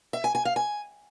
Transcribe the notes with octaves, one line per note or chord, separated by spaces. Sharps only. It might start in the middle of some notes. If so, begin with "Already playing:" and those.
E5
G#5
G#5
F5
G#5